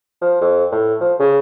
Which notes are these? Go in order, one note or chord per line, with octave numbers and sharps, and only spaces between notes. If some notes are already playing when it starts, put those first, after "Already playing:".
F3
F2
A2
F3
C#3